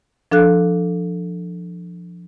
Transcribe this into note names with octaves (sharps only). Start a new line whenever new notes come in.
F3 D4 A4 F5 F#6